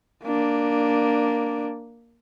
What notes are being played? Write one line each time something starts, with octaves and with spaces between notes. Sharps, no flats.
A#3 D4